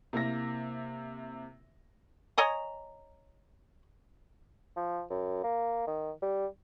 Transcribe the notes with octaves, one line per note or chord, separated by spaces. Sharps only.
C3 A#3 E4 E5 A#6
C#5 D#5 G#5 A#5
F3
F#2
A#3
D#3
G3